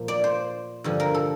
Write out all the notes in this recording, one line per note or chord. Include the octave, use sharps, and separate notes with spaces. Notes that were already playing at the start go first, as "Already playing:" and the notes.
Already playing: A#2 F3
D5
C5
G2 D3 F3
A#4
A4